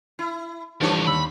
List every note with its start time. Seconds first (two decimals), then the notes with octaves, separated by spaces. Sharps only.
0.19 E4
0.81 A1 E3 F3 G3 A3 C4 D4 C#5
1.07 D#2 B5 E6